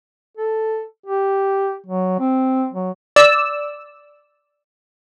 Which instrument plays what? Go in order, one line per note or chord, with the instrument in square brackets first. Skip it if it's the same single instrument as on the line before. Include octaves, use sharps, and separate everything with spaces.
[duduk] A4
G4
F#3
C4
F#3
[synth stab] D5 E6